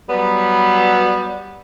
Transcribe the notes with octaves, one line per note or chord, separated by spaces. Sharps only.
F#3 G3 B3